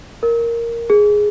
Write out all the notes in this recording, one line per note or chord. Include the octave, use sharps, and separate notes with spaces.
A#4
G#4